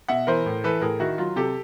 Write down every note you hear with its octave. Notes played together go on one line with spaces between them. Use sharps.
B2 E5 F#5
E3 A#4 C5
A2
E3 A4 B4
A2 G#4 A#4
D#3 E4 F#4
F#3 F4
C3 G4 A4